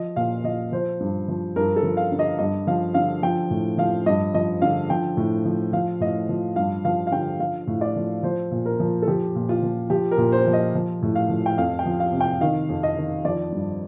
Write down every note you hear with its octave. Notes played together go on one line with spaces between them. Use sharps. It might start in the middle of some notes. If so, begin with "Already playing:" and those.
Already playing: F3 D#5
A#2 F5
F3 D#5
F3 C5
G2
F3
G2 A#4
A4
F3
F5
D3
D#5
G2 D#5
F3 F5
D3 F5
F3 G5
A2
F3 F5
G2 D#5
F3 D#5
D3 F5
F3 G5
A2
F3
F3 F5
A2 D#5
F3
G2 F5
F3 F5
F5
D3 G5
F3 F5
A2
D5
F3
F3 C5
A#2
A#4
F3
A4
F3 G4
A#2
F4
F3
F3 G4
A#4
A#2
C5
F3
D#5
F3
A2
F5
F3
G5
F2 F5
G5
F3
F5
C3
G5
D#3 F5
F2
D#5
D#3
F3 D5
G2